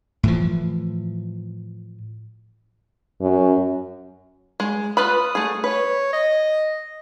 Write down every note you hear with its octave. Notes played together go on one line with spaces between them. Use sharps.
A2 E3 F3
F#2
G#3
F4 B4 B5 D#6
A3 G#4
B4 C#5
D#5